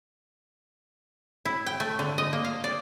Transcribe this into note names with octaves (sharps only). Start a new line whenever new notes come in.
E4
G5
A3
D3
D#5
A#3
F5
D5